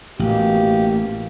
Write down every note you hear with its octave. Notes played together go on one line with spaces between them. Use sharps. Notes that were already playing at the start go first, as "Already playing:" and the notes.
A1 B2 A#3 G4